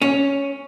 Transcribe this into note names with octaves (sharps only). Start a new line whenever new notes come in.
C#4